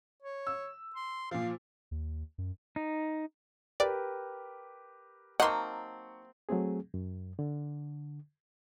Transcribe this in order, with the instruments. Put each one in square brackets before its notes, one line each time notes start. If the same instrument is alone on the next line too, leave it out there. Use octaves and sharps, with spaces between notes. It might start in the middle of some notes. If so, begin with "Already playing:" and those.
[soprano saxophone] C#5
[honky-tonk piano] E6
[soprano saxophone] C6
[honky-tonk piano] A#2 F3 [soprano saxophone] F5
[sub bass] D#2
F#2
[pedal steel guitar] D#4
[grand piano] G4 A#4 B4 [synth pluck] D5
[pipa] F#3 A#3 C4 [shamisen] D#4 [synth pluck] F#5 C6 [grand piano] A5 C#6
[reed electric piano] F#3 A3 C4 G#4
F#2
D3